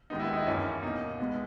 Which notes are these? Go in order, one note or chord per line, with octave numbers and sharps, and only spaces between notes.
D#2 D#3 G#3 B3 D#4
E4
D#4
E4
F#2 E3 A#3 C#4
B2 A#3 D#4
B2 G#3 B3